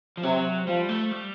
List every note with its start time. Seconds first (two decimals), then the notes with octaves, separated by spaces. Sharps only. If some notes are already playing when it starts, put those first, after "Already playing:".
0.17 F3
0.23 C3 F#3
0.67 F3 G3
0.89 A3
1.11 G3